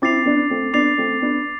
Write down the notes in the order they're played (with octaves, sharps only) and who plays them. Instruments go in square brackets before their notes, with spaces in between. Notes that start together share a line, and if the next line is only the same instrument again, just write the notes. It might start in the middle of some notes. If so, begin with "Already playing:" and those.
[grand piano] C4 E4 [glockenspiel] D6 A6 C7 F7
[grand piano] B3 D4
A3 C4
[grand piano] B3 D4 [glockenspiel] D6 A6 C7 F7
[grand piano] A3 C4
B3 D4